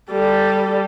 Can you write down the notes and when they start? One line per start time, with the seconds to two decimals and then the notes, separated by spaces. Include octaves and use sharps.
0.11 G3 A4